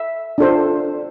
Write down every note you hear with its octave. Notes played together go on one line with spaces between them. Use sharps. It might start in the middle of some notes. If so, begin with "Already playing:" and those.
Already playing: E5
D4 F4 A4 C5